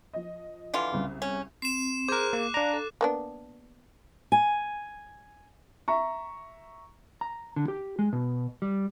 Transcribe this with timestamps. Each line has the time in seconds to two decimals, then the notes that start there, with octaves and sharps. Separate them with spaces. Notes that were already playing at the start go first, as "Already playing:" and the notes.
0.13 F3 D#5
0.74 D3 E3 F4
0.92 C2 C#3
1.22 C#4
1.62 C4 C7 E7
2.08 G#4 A#4 C5 D6 F#6
2.33 A#3
2.54 D4 D5 F5 A#5
2.73 A4
3.01 A#3 B3 D4
4.32 G#5
5.88 E5 A#5 C#6
7.21 A#5
7.56 D3
7.68 G4
7.99 G#3
8.13 B2
8.62 G3